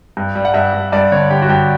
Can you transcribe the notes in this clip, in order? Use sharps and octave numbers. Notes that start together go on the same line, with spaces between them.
G2
G3
F#5
G2 E5
G2
G2 D5
D3 C#5
D3 G4
F#4
G2 G4